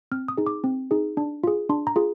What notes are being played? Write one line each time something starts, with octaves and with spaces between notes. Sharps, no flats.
C4 F6
D#6
D#4 G#4
D6
C4
D#4 G#4
D4
F4 G#4
D4 C6
A#5
F4 G#4